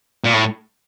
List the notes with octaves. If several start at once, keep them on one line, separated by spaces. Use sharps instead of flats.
A#2
A2